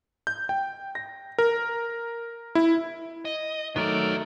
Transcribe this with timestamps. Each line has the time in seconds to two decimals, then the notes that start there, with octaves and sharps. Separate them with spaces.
0.27 G6
0.49 G5
0.95 A#6
1.38 A#4
2.55 E4
3.25 D#5
3.76 D#3 F#3 A3 B3 A#4 D5